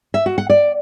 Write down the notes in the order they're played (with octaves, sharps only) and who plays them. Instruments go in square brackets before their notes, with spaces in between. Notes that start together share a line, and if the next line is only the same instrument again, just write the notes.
[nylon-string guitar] E5
F#4
F#5
D5